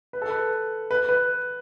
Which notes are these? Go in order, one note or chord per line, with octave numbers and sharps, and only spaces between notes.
B4
A4
B4
B4
B4